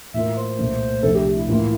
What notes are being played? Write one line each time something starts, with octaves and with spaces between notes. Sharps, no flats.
A2 E3 A#3 F4 A#4 E5
C5
C2 A#2 A3
C2 C3 F3 A3 D4 A4
G4
E4
A2 E3 A#3 F4